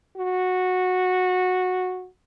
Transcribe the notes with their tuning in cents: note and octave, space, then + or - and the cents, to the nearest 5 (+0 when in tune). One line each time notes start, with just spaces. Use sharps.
F#4 -15